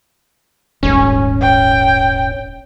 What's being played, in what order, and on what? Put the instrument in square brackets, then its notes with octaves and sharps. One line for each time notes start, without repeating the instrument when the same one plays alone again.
[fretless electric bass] D#1 G#1 [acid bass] C#4
[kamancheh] G5